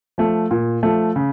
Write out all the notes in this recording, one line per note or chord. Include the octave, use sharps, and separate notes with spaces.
F3 A3
A#2
F3 A3
C#3